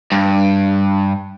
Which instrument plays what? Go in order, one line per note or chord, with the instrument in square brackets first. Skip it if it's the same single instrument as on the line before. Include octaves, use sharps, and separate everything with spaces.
[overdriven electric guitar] G2